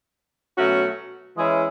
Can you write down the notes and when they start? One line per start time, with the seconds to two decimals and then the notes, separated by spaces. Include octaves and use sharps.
0.57 B2 F#3 A3 C#4 F#4
1.36 E3 G#3 C#4 E4 G#4